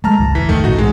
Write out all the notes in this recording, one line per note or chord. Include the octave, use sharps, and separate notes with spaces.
G#3 A3 A5 A#5 F6
G#1 C#2 E3
E1 E3 B6
G#1 E2 D#3 A3
B1 A2 E3 D#4 F#4
G#3